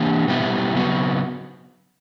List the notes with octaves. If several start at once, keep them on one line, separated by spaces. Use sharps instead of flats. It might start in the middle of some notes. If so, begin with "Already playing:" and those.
Already playing: E3 A#3 D4 G4
B2 G3 B3 E4 G4
C#3 F#3 B3 F#4